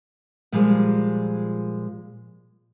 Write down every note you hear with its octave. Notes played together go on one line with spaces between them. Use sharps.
A#2 F3 G3 G#3